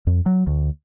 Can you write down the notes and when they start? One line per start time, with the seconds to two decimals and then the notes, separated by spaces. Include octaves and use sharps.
0.07 F2
0.26 F#3
0.47 D2